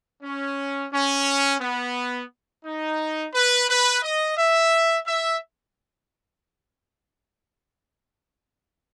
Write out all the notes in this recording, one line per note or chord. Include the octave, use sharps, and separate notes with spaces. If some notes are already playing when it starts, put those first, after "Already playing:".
C#4
C#4
B3
D#4
B4
B4
D#5
E5
E5